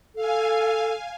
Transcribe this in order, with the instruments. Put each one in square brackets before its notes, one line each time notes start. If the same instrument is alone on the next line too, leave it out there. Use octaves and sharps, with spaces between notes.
[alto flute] A4 [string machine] F5 G#5